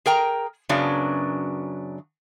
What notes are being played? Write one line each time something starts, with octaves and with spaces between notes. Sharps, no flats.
G#4 A#4 G5 A#5
F#2 C#3 F#3 B3 D4